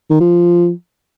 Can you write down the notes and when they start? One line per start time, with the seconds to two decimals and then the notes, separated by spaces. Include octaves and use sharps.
0.10 D#3
0.20 F3